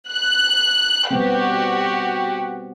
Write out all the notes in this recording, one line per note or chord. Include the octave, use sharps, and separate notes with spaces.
F#6
G3 B3 C4 F#4 G4